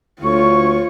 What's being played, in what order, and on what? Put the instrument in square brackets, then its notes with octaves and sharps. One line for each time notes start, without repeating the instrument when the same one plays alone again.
[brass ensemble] D2 [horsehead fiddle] F4 C#5 [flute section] C#6